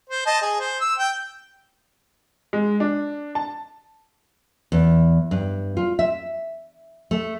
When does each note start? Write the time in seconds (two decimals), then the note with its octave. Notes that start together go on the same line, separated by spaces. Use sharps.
0.09 C5
0.26 D#5 A5
0.42 G#4
0.60 C5
0.81 E6
0.99 G5
2.53 G#3
2.80 D4
3.35 A5
4.72 E2
5.31 G2
5.77 F4
5.99 E5
7.11 A3